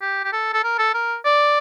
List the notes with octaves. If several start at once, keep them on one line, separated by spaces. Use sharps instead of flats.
G4
G4
A4
A4
A#4
A4
A#4
D5